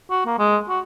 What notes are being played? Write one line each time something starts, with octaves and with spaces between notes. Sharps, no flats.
F#4
A#3
G#3
F#4